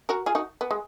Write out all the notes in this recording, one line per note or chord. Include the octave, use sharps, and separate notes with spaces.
F#4 A#4
F4 G#4
D#4 F#4
B3
G#3